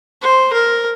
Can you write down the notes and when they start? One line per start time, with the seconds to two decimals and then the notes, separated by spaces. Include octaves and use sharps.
0.22 C5
0.53 A#4